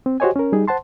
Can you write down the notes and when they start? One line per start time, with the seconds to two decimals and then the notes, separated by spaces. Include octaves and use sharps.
0.06 C4
0.20 F#4 G4 C5 C#5 D#5 G#5
0.36 C#4 A#4
0.52 G3 D#4 G#4
0.68 C5 F#5 A5 C6